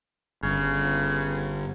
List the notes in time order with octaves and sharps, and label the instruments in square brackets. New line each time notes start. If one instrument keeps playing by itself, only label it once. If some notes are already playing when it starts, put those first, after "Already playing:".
[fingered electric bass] G1 [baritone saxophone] C#3